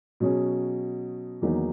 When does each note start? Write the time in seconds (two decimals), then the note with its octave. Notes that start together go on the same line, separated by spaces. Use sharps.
0.20 B2 F#3 C#4 G#4
1.42 E2 D#3 F#3 A#3 D#4